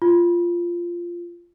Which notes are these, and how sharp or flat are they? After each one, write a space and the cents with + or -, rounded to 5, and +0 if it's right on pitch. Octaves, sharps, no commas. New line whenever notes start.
F4 -10